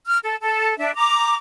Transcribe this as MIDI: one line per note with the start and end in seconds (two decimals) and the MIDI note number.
0.06 0.18 89
0.24 0.36 69
0.41 0.77 69
0.78 0.94 62
0.78 0.94 76
0.95 1.35 82
0.95 1.35 86